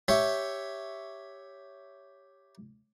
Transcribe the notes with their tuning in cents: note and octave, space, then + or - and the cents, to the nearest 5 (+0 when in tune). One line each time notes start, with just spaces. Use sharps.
G4 +0 C#5 +0 E5 +0